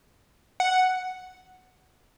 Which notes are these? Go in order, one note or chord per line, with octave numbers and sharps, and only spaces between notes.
F#5